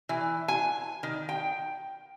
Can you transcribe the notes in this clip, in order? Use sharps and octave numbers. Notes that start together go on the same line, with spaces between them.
E3
G#5
D#3
G5